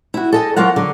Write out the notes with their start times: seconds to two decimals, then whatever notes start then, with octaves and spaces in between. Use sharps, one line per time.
0.14 E4 F#4
0.32 A4 D#5 G#5
0.56 F#3 A#3 F4 F#5
0.76 D3 F#3